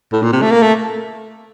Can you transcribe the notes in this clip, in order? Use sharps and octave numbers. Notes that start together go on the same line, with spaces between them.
A2
A#2
C3
A3
A#3
A3